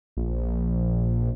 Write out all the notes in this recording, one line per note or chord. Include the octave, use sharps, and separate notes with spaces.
A#1